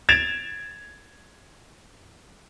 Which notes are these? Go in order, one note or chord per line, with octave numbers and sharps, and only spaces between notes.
G#6 A6 D7 E7 F7